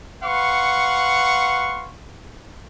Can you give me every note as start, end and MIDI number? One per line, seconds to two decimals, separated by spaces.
0.23 1.91 71
0.23 1.91 77
0.23 1.91 78
0.23 1.91 84
0.23 1.91 85